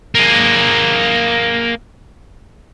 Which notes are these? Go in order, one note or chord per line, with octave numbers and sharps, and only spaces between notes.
A#3 G#4